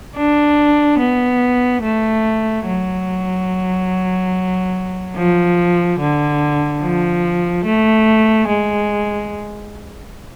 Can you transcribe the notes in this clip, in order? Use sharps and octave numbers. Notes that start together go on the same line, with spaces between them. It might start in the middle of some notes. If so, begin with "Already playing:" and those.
D4
B3
A3
F#3
F3
D3
F3
A3
G#3